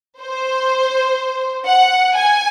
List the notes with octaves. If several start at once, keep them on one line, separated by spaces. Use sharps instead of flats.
C5
F#5
G#5